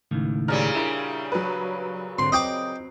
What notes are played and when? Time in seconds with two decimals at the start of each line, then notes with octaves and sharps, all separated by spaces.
0.11 C#2 A2 D#3
0.48 A#2 C#3 G3 A#5 F6
0.75 D4 E4 A#4 D7
1.32 F#3 B4
2.19 G#2 D3 C4 C6
2.32 C4 D#5 G5 D6